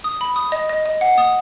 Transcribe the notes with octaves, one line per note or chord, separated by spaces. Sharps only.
D#6
B5
D#6
D#5
D#5
D#5
F#5
D#6